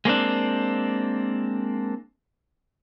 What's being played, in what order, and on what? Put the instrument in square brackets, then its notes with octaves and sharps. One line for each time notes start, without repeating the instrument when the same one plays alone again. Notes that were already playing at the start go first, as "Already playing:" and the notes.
[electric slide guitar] G#3 A#3 C4 D4